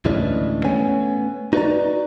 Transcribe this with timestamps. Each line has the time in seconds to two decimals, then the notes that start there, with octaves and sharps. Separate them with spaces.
0.05 D2 A2 E3 G#3 C#4 D4
0.63 A3 B3 C#4 C#5 G#5
1.53 D#4 F#4 B4 C#5 D5 A#5